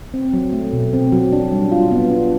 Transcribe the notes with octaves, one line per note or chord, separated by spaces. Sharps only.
C4
F#3
A3
B2
C4
F#3
D4
G3
F4
B3
D4